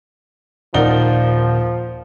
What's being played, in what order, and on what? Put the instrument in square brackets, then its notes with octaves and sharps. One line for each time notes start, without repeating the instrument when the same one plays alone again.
[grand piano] D#1 F#5 G7 [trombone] F3 [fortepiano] D#4 A#4 D5